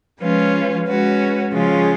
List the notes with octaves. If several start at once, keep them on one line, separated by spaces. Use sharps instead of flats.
F3 G#3 C#4 F4 B4
G#3 C#4 F#4 B4
C#3 F3 G#3 C#4 F4